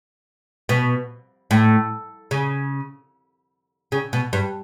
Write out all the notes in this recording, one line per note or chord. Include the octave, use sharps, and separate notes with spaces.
B2
A2
C#3
C#3
B2
G2